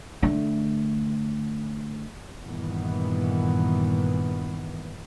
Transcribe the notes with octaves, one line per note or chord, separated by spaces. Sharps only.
D3 A3
G2 A#2 D#3 E3 B3